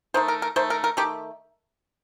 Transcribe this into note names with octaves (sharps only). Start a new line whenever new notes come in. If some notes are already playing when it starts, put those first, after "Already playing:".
D#3 A3 C5
A#4
A#4
D#3 A3 C5
A#4
A#4
D#3 A3 G4